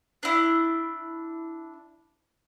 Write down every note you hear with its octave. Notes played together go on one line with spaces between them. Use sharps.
D4 E4